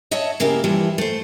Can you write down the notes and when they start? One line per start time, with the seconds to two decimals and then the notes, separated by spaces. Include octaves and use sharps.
0.11 C#5 D#5 E5 F#5 A5
0.40 C#3 G#3 A#3 E4 G4 A#4
0.64 E3 F3 G3 E4
0.98 A3 C5